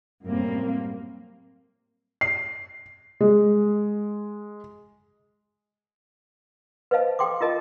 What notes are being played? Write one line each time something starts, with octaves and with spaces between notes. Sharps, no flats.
F#2 A2 C3 G3 A#3 C4
C7
G#3
B4 C5 D#5 F5 A5
A4 G5 C6 D6
F4 A#4 D#5 A5